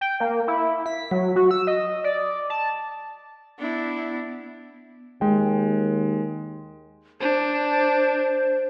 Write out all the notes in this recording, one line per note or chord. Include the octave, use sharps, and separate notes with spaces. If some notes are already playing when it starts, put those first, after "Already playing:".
G5
A#3
E4
B6
F#3
F#4
E6
D#5
D5
A5
B3 D4 E4
D#2 G#3 G5
D4 C5